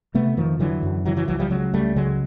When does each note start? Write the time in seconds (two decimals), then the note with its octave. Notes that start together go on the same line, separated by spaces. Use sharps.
0.14 C3 A3 B3
0.37 F2 D#3 F3
0.60 D3 E3 F#3
0.83 F#2
1.05 C#3 E3 F#3
1.16 E3 F#3
1.28 C#2 E3 F#3
1.39 F3 G3
1.50 C#3 F#3 G#3
1.73 C#2 G3 A3
1.96 C#3 F#3 G#3